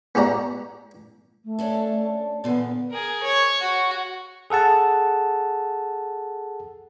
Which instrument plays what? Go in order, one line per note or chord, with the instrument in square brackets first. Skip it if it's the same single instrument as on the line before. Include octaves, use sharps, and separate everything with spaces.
[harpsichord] B3 F#4 G4 D5 A#5
[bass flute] A3
[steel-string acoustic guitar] C#4 D4 A4
[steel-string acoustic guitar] A#2 D3 E3 [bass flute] B3
[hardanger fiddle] G#4 A#4
C#5
F#4
[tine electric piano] G#4 A4 F#5 A5